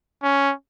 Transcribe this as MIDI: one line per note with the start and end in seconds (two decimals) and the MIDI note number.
0.23 0.52 61